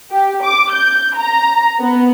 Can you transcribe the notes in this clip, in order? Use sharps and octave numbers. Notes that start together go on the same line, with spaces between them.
G4
D6
G6
A#5
B3